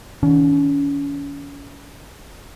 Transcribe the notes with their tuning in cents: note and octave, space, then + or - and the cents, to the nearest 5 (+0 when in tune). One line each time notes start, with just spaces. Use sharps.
D#3 +45 C#4 +30